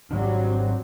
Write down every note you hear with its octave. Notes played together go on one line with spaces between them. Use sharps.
G#2 D#3 F#3 G3 C4 D4